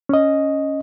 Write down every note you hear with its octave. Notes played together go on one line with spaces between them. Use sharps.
C#4 D#5